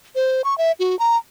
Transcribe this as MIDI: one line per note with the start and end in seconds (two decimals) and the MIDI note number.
0.15 0.42 72
0.44 0.57 85
0.58 0.72 76
0.79 0.98 66
0.99 1.17 82